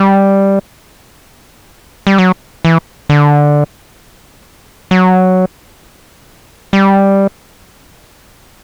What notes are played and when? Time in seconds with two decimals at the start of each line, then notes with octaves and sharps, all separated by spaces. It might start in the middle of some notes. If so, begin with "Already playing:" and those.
Already playing: G3
2.07 G3
2.18 F#3
2.65 E3
3.09 D3
4.91 F#3
6.73 G3